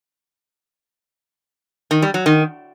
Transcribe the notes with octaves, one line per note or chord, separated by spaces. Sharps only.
D#3
G3
F#3
D#3